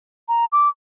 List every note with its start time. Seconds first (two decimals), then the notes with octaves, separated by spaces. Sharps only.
0.29 A#5
0.52 D6